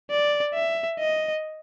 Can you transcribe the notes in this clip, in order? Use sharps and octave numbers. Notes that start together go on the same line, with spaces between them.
D5
E5
D#5